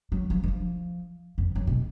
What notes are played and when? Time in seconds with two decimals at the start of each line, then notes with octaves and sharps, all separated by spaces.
0.12 F#3
0.30 F3
0.44 D#3
0.48 F3
1.38 F2
1.55 F#2
1.67 B2